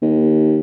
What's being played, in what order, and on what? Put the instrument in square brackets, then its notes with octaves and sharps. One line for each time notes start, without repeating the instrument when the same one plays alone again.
[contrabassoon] D#2